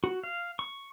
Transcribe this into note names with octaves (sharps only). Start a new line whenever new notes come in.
F#4
F5
C#6